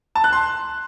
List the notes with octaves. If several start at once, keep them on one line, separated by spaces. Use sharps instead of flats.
A5
F#6
C6